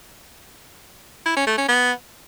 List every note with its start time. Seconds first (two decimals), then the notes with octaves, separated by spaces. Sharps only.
1.26 E4
1.36 C#4
1.47 A3
1.58 C#4
1.68 B3